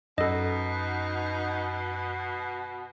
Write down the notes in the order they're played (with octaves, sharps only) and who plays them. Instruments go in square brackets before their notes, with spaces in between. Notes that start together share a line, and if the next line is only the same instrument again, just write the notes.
[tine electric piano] F#2 [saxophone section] B2 [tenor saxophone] D#4 [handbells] A4 D#5